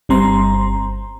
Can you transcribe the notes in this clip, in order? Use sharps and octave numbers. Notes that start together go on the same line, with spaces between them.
G1 G3 C4 A#5 C6